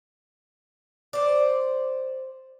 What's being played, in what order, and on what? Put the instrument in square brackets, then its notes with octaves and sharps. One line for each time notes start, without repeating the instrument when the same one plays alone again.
[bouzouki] C5 D5